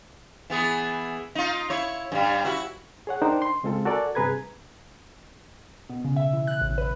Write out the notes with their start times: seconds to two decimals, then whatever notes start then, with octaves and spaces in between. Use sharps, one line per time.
0.50 E3 B3 G#4
1.35 D#4 F4
1.70 E4 C#5
2.12 G2 G3
2.44 E4 F#4
3.07 G#4 C#5 F#5
3.22 D4 D#4 A#4 C5 G5
3.42 C6
3.63 C#3 G#3 C4 F4 A4
3.85 F#4 A4 A#4 D5 G#5
4.15 G2 C3 G#4 B4 A#5 G#6
5.89 B2
6.05 C#3
6.16 E5
6.33 E3
6.47 F#6
6.61 A1
6.78 B4